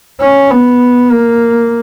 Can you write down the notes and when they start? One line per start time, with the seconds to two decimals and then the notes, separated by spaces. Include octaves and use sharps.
0.21 C#4
0.51 B3
1.11 A#3